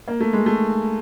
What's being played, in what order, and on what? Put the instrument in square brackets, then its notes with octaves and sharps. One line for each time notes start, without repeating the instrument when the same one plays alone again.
[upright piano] A#3
A3
G#3
A3